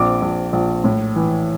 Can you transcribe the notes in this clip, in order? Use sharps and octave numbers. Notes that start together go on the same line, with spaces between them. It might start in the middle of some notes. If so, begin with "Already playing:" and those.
Already playing: A#1 C4 D6
A#1
A#1
A2
E3